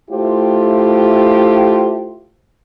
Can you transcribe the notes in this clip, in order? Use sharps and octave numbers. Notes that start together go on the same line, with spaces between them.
A3 E4 F4 G4 C5